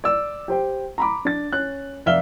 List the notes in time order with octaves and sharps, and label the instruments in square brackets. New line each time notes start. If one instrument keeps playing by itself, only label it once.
[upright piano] D5 E6
G4 C5 G5
A#5 B5 D6
D4 A6
C#4 F#6
F1 D5 E5 F5 F6 G7